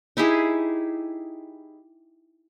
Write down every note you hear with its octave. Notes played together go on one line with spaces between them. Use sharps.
D#4 E4 G4 G#4